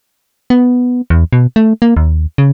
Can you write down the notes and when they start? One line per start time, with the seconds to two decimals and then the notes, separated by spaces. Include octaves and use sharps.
0.50 B3
1.10 E2
1.33 B2
1.56 A3
1.82 A#3
1.97 D#2
2.38 C#3